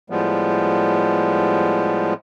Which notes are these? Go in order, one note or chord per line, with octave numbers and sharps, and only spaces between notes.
A2 F3 G3 G#3 B3